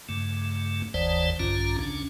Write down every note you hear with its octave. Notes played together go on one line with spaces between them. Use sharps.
G2 C#3 A3
F#1 D#2 E3 C5 D5 A5
A#1 G2 D3 C#4 F4 A#5
D2 C#3 C#4 D4